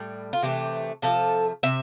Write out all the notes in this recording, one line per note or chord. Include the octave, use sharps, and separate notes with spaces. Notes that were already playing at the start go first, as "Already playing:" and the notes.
Already playing: A2 G3
F4
C3 E3 A3 G4
C3 F3 A3 A4
C3 E5